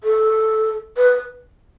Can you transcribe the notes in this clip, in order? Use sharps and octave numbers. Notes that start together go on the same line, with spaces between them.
A4
B4